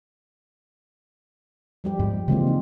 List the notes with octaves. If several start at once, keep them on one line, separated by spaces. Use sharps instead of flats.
F3 G3 G4
G#2 G#3
C#3 E3 G#3 A#3 C4 F4
D#4